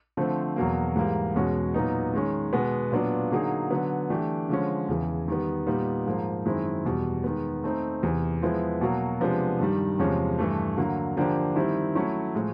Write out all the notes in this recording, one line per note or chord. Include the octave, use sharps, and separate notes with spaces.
D3 F3 A3 C4
E2 B2 F#3 A#3
G#2 E3 G3 A#3
E2 B2 G#3 C#4 F#4
A#2 F#3 B3 D#4
D#3 G#3 C#4
B2 G#3 B3
A#2 F#3 B3 D4 F4
D3 F#3 A#3 D#4 G#4
D3 F#3 B3
E3 A3 D4 G4
D3 F3 G#3 C#4
E2 C#3 E3
D#3 G3 B3
A#2 G3 B3 D#4
G#2 F3 A#3
F#2 D#3 G#3 C4 E4
E2 B2 G3
D#3 G#3 B3
A3 C4 D#4
E2 C3 E3
F3 G#3 B3 E4
B2 F#3 A#3
C3 F3 G#3 B3 D4
G2 D#3 G3
E2 C3 F3 G#3 C#4
G2 E3 A3
D3 F#3 A#3
D3 F3 A#3 D4 G4
D#3 G3 C4 E4
F#3 A3 C#4 E4
A2 F3 G#3